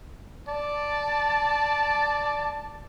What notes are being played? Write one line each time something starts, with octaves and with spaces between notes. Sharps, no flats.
D5 A5